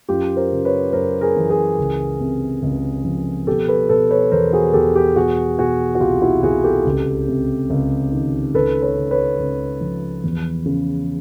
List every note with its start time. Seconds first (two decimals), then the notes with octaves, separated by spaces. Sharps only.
0.09 F#2 F4 G4
0.36 A#4 C5
0.51 C#3
0.65 B4 C#5
0.93 F#2 A#4 C5
1.21 G#4 A#4
1.36 E3
1.50 G#4 A#4
1.78 C#2
2.20 C3
2.63 C#2
3.05 F3
3.46 B2 G4 A4
3.68 A4 B4
3.89 B2 A4 B4
4.10 B4 C#5
4.31 E2 A#4 C5
4.53 F#4 G#4
4.73 E2 G4 A4
4.95 G4 A4
5.16 B2 F#4 G#4
5.58 B2 F#4 G#4
5.95 F#4
6.00 C2 F4 G4
6.22 E4 F#4
6.43 C2 F#4 G#4
6.64 G4 A4
6.85 C#2
7.28 C3
7.70 C#2
8.12 D#3
8.54 C#2 A4 B4
8.82 B4 C#5
8.97 C#3
9.11 B4 C#5
9.39 C#2
9.81 F3
10.24 E2
10.66 C#3